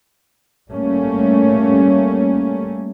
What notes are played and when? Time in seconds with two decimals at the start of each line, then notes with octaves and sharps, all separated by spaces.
0.70 G3 A3 A#3 C#4